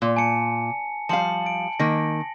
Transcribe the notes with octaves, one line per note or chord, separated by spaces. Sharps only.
A#2
G#5 A5 C#7
F3 G3 F5 A5 C#7 F#7
D7
D#3 A#3 A#6